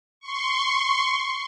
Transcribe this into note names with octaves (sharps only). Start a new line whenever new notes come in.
C6 C#6